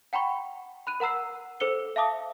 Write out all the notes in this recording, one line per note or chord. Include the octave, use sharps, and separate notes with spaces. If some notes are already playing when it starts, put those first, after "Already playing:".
F#5 G5 A#5 B5 C#6
B5 F#6 D#7
A#4 F#5 A#5 E6 C7
A4 C5 E6 C#7 G7
E5 F5 A5 D6 D#6